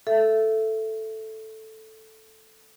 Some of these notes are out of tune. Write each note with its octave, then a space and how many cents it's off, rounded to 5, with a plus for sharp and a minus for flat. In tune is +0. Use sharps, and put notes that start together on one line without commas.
A4 +0 E5 +15